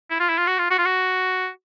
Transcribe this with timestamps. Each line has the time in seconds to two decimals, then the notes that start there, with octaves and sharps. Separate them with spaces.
0.10 E4
0.20 F4
0.29 E4
0.38 F4
0.47 F#4
0.58 F4
0.70 F#4
0.78 F4
0.85 F#4